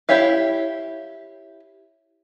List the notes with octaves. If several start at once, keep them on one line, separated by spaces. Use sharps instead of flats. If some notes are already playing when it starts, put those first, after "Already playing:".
E4 G4 C#5 E5 F5